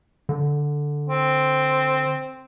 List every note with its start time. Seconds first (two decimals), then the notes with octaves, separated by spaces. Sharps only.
0.29 D3
1.09 C4